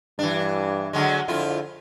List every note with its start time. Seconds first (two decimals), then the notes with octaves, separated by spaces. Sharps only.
0.19 G2 E3 D4
0.93 D3 F#3 G#3
1.28 F2 D3 E4 F4